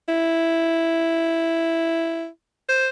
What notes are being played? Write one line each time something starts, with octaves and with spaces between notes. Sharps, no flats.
E4
C5